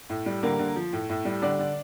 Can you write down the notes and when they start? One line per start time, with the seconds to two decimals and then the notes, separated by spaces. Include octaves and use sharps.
0.10 A2
0.26 G3
0.43 D3 A#3 A#4
0.59 D3
0.76 F3
0.93 A2
1.10 A2
1.25 G3
1.42 D3 D4 D5
1.59 D3